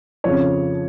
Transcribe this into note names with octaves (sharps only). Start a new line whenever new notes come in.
F2 C#3 F3 C#5